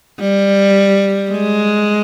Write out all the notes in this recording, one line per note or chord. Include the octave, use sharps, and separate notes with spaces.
G3
G#3